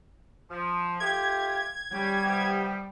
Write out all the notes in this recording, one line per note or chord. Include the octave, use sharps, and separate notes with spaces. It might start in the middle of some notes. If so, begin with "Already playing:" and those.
F3
A3 F4 G4 G#6
G3 C#4 G4
C3 B3 G4